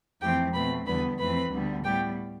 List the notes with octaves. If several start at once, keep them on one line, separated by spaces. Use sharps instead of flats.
F2 E3 A3 C4 G4 G5
B2 A3 C4 B4 B5
E2 D3 G3 B3 B4 B5
F2 E3 A3 C4 B4 B5
D2 D3 G3 B3
A2 G3 B3 G4 G5